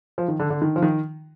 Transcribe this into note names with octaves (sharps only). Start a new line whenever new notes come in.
F3
D#3
D3
D3
D#3
F3
D#3